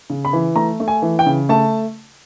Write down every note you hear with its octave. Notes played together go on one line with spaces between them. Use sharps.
C#3
B5
E3
A3 A#5
A3
G#5
E3
G5
C#3
A3 A5